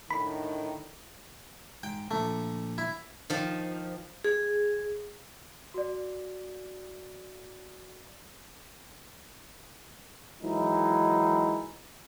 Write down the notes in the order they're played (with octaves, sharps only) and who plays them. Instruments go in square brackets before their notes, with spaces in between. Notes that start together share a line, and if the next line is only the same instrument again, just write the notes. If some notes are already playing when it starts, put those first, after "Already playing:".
[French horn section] A2 D3 D#3 [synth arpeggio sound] B5
[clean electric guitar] G#2 [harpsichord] G5
[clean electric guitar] A#2 D3 F3 [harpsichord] A3
[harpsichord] E4
[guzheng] D#3 F3
[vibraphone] G#4
[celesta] F#4 D5
[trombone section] D#3 E3 F#3 G#3 D#4 E4